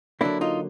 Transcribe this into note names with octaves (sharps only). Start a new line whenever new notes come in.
D3 F#3 A#3 D4 E4
D#4 F4